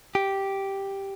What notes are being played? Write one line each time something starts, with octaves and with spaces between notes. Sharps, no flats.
G4